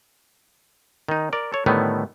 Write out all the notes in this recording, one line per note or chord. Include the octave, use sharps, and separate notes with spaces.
D#3 D#4
A#4 D5
A4 C#5
A2 D3 D#3 G3 A3 B3